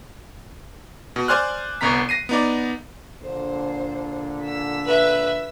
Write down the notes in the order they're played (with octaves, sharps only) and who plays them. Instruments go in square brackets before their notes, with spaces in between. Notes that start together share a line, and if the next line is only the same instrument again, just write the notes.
[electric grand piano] B2
C5 D5 G#5 C6 F6 F#6
G1 C2 B3 A#5 B6
A#6 C7 D#7
B3 D#4 D5
[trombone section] A#2 D3 [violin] C5
[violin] E6 B6
[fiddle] B4 E5